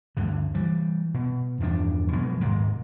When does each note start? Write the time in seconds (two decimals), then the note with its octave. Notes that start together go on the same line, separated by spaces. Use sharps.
0.17 D2 G2 D3
0.54 E3 G3
1.14 B2
1.60 E2 G2 F3 D4
2.12 B2 F3 F#3 G#3
2.41 D#1 G#2 C3 D#3